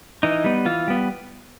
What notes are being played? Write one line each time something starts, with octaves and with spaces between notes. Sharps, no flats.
E3 D#4
G3 B3
E3 F4
G3 B3